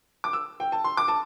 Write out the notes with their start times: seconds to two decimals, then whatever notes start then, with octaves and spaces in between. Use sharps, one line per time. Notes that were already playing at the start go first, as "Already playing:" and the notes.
0.24 D6
0.33 E6
0.60 G5
0.72 A5
0.84 C6
0.97 D6
1.08 A5